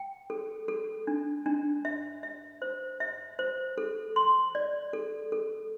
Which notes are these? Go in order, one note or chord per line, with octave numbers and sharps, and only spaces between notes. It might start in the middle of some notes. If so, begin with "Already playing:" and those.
Already playing: G5
A4
A4
D4
D4
E5
E5
C5
E5
C5
A4
C6
D5
A4
A4